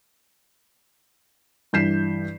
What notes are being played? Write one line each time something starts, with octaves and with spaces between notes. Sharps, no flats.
G2 E3 G6 B6 C7 E7